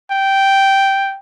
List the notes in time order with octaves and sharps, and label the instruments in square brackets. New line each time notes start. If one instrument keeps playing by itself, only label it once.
[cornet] G5